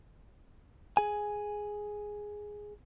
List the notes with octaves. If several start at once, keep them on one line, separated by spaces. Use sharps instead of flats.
G#4 G#5